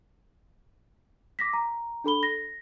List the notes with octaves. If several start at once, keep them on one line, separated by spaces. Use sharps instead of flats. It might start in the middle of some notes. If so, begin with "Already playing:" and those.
D6 A#6 B6
A#5
D4 A4 B5 G7
A#6